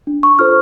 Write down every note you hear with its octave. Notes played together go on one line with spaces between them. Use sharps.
D4
C#6
F4 A4 C5 F6